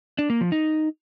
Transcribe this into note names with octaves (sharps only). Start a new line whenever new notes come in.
D4
A#3
F3
D#4